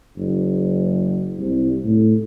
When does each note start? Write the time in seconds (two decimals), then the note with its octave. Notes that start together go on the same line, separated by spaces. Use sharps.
0.17 F#1
1.38 C2
1.85 A2